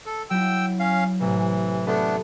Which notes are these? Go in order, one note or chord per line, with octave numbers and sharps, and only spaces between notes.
A4
F#3 E4 G5 E6
C#4 F5
A1 C3 E3
A3 B3 D4 A4 B4